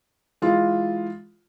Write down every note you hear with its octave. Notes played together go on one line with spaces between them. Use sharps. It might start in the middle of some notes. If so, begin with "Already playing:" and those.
E3 G#3 F4